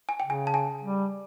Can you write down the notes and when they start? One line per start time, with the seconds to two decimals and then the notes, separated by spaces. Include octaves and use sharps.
0.09 G#5
0.20 C#3 G5
0.30 G#5
0.47 A5
0.54 G#5
0.84 G3